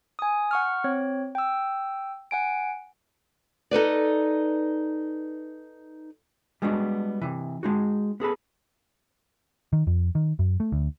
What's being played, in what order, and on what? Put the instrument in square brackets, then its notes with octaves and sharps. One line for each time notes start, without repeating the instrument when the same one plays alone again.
[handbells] G#5 D#6
F#5 C#6 F6
C4 C#5
G5 E6
F#5 G#5 D7
[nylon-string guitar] D#4 A4 B4 D5
[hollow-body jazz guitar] G3 G#3 B3 D4 D#4 F#4
C3 E3
G#3 D#4 F#4
B3 G#4 A4 B4
[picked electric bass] D#3
F2
D#3
F#2
A3
D2